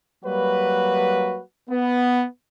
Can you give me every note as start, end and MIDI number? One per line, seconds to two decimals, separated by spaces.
0.24 1.40 54
0.24 1.40 55
0.24 1.40 58
0.24 1.40 66
0.24 1.40 71
1.69 2.24 59